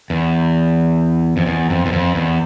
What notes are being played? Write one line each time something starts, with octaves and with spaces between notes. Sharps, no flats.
E2
F2
E2
F2
E2
F2
E2